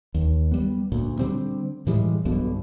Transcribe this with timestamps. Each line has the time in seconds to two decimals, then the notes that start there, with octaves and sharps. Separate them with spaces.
0.14 D#2
0.51 G3 B3
0.92 D2 A#2
1.19 D3 G3 C4 D4
1.87 A2 E3 G3 G#3
2.25 B1 G2 B2 D3